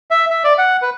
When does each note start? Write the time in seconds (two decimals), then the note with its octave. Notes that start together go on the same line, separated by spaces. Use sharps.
0.11 E5
0.30 E5
0.44 D5
0.58 F#5
0.82 B4